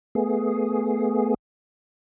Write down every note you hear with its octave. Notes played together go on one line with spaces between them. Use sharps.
A3 B3 G#4